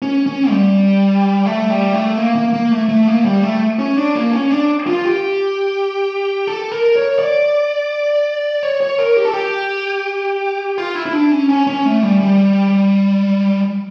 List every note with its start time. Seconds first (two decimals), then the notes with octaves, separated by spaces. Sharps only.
0.02 C#4
0.26 C#4
0.50 G3
1.46 A3
1.70 G3
1.94 A3
2.18 A#3
2.36 A#3
2.53 A#3
2.72 A3
2.89 A3
3.08 A#3
3.25 G3
3.43 A3
3.79 C#4
3.97 D4
4.15 A#3
4.33 C#4
4.51 D4
4.87 F4
5.04 G4
6.47 A4
6.72 A#4
6.96 C#5
7.19 D5
8.63 C#5
8.81 C#5
8.98 A#4
9.16 G4
9.25 A4
9.33 G4
10.78 F4
10.95 E4
11.06 E4
11.13 D4
11.31 C#4
11.49 C#4
11.67 C#4
11.85 A3
12.03 G3
12.21 G3